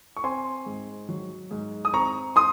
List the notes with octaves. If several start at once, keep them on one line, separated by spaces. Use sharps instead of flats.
C#6
C4 G#5 C6
G#2
F#3
G#2
D#6
C4 A#5 C#6
C6 D#6